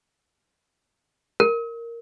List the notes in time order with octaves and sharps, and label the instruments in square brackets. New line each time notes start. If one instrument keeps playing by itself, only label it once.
[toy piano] A#4